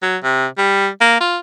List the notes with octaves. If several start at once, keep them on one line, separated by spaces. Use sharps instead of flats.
F#3
C3
G3
A#3
F4